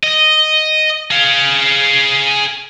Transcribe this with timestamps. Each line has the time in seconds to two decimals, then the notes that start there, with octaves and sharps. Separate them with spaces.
0.03 D#5
1.11 G#4 F5